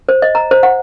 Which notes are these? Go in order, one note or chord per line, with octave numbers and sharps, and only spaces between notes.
C5
D#5
A#5
C5
F#5